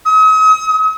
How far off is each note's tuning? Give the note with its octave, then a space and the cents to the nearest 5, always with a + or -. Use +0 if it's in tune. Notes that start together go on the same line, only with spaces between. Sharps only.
D#6 +40